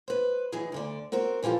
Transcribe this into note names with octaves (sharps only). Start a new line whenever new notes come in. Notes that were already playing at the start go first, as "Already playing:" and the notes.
B4 C5
E3 F#3 D#4 G#4
D2 D3 D5
C4 F#4 A#4 C5
A#2 E3 F3 G4 A4